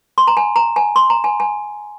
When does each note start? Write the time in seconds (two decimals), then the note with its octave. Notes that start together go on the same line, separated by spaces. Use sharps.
0.18 C6
0.27 A#5
0.37 G#5
0.56 A#5
0.76 G#5
0.96 C6
1.10 A#5
1.24 G#5
1.40 G#5